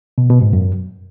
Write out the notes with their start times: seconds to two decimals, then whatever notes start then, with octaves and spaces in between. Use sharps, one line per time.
0.18 B2
0.30 B2
0.41 G#2
0.53 F#2